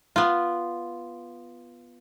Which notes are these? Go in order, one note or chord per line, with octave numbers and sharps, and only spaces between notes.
B3 F4